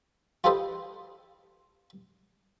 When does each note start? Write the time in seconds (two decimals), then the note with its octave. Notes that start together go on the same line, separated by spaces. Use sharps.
0.44 F4 G4 A4 B4 C5 D#5